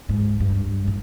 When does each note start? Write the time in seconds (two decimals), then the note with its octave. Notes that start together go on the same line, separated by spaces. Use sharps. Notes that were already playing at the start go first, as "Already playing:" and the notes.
0.09 G#2
0.40 G2
0.87 A2